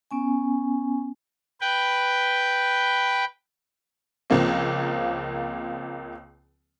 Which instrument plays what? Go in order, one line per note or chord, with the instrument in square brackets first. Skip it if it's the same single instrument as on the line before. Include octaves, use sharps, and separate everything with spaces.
[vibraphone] B3 C#4 G#5
[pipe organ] B4 G5
[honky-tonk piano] C#2 F3 A#3 C4